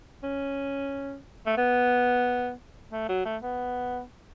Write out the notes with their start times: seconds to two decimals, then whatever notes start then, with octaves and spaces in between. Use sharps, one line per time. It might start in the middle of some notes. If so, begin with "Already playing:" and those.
0.23 C#4
1.47 A3
1.57 B3
2.92 A3
3.09 F#3
3.25 A3
3.43 B3